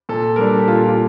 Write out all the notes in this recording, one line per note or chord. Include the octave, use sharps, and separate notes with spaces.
A#2 A4
G3 D4 A#4
A4
G4
A#2 F4
F4